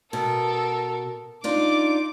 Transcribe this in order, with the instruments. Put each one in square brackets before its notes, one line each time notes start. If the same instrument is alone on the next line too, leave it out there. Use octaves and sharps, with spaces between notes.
[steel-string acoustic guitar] B2 [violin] A4 A#4
[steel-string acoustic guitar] D4 D#4 F4 [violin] D6